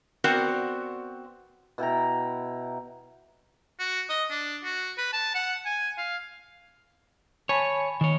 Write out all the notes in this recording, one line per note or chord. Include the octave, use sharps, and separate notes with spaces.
B3 C4 F#4 A#4 D5 F#5
B2 E4 G5 A#5
F#4
D#5
D4
F#4
B4
A5
F#5
G#5
F5
C#5 G#5 A5 B5
D#3 C#5